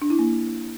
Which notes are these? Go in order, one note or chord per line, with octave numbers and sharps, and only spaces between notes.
D4
E4
A#3